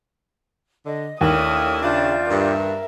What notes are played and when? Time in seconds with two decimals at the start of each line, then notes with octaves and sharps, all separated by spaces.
0.85 D3 D#5
1.21 D#2 A3 D4 E4 C#5 D#6 F6
1.82 C#3 D4 F4 D5 E5 G6
2.30 G2 A#4 E5